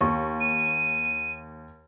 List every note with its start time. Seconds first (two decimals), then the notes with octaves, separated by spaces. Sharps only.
0.01 D#2 C#6
0.40 D#7